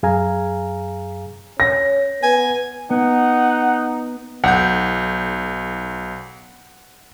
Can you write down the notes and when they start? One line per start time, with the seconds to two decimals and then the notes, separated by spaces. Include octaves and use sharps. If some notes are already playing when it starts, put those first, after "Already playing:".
0.03 F#2 G#4 F5 G#5 A#5
1.60 C#4 A#6
2.23 B3 G#5
2.91 B3 D#4 F#5
4.44 B1 F#5 G6